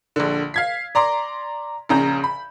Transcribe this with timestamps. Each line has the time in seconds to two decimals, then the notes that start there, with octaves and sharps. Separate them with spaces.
0.16 A#1 D3
0.54 F5 G#6 B6
0.95 D5 A#5 C6 D6
1.89 A#1 C#3 A#5 G6
2.24 B5